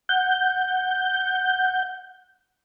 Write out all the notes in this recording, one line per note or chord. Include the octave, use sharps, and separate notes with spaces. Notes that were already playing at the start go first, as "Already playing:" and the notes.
F#5 G6